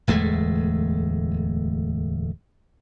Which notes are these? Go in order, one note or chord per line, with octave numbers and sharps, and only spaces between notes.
D1 E2 G#3 A3